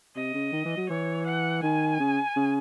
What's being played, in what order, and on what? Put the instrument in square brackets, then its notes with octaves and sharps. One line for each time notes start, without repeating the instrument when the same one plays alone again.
[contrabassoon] C3 [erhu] D#5
[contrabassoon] C#3
D#3
E3
F#3
[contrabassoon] E3 [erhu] C#5
[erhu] F#5
[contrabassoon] D#3 [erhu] G#5
[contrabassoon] C#3
C#3